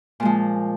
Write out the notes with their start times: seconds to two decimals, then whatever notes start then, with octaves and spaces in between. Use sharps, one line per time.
0.20 A#2
0.23 G#3
0.25 F3